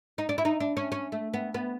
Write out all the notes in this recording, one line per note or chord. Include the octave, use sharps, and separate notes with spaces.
D#4
D4
E4
D#4
D4
C#4
C#4
A3
B3
B3